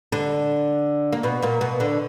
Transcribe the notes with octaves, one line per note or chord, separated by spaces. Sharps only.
D3 D4
A#3
B2 B3
A#2 A#3
B2 B3
D3 D4